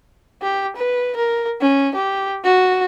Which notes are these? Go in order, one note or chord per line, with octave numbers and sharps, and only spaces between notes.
G4
B4
A#4
C#4
G4
F#4